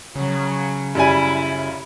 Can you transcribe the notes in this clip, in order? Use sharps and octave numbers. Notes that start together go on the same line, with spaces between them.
C#3 F#3
F#2 G3 E4 G#5